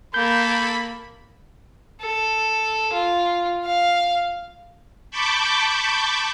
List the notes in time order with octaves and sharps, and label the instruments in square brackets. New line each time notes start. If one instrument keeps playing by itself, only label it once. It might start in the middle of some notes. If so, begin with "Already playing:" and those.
[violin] A#3 A4 [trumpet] B5 [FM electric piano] G6
[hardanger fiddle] A4
F4
F5
[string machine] A5 B5 C#6 D6 G6